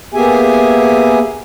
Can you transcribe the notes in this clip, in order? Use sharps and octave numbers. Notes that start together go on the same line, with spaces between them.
A#3 B3 G4 G#4 E5 G#5